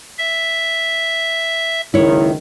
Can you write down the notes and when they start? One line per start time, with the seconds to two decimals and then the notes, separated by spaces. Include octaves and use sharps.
0.18 E5
1.94 F#1 C#2 D#3 E4 C#5